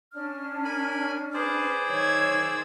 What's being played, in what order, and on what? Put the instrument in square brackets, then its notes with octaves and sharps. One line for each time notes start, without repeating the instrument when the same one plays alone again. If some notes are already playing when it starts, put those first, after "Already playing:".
[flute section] C#4 D4 F6
[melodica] A#4 G#5 B5
[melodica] G#4 C5 D5 [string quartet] B4
[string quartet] D#3 E6 G#6 [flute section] C#5